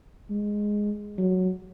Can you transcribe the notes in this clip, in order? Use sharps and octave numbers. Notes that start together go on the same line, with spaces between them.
G#3
F#3